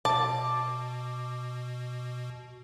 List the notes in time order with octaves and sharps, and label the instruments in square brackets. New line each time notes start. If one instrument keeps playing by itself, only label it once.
[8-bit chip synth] B2 [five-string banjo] A5 [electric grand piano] D6